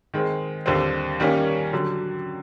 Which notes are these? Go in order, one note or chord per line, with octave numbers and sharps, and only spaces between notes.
D#3 G#3 C4
D#2 D3 G3 C4
D#3 G3 A#3 C#4
D3 F#3